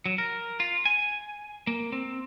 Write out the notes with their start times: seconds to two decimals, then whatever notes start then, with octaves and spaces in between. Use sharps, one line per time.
0.06 F#3
0.18 A#4
0.60 F4
0.85 G#5
1.67 A#3
1.92 C4